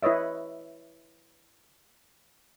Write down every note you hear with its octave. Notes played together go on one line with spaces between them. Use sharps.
E4 B4 C#5 D#5 E5